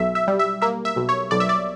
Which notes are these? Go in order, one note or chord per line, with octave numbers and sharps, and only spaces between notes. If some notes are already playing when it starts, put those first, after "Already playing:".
Already playing: B1 E5
E5
G3
E5
A#3 E5
E5
B1
C#5
B1 D5
E5
D5